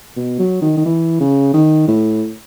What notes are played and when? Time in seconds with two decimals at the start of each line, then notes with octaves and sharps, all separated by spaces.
0.16 B2
0.39 F#3
0.62 D#3
0.77 D#3
0.85 E3
1.20 C#3
1.54 D#3
1.88 A2